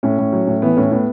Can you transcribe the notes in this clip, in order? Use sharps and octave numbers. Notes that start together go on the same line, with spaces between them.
A2 C#4
A2
F#3
A2
E3 B3
A2 C#4
A2 B3